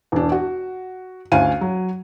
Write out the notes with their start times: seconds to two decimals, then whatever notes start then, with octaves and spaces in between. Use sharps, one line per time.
0.12 E1 D4
0.32 F#4
1.32 D2 C#4 F5 G#5 D#7
1.61 F#3